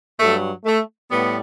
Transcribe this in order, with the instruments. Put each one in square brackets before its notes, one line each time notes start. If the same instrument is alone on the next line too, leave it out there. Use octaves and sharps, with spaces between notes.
[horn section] G2 F#3 A3
A3
A2 G3 B3